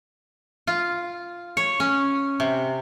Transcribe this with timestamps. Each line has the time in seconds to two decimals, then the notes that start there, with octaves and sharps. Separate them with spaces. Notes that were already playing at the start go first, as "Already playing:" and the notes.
0.67 F4
1.57 C#5
1.80 C#4
2.40 C3